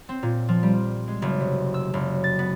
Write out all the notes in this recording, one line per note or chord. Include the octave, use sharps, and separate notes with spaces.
C4
A#2
F3
G3
G#3
F#1
C3
E6
F#1
A6
B3